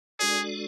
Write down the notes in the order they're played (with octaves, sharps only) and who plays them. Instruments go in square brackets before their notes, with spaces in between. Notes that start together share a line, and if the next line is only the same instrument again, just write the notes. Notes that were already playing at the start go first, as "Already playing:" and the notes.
[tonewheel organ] G#3 D4 F#4 A4 D5 [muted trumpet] G#4